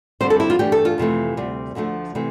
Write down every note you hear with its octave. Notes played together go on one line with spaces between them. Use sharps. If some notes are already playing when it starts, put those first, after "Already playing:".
G2 D3 G3 C4 C5
A4
E4
F4
G2 E3 A3 D4 G4
A4
F4
F2 C3 E3 A3
D2 C3 G3
D2 D3 F3 A3
C3 E3 A3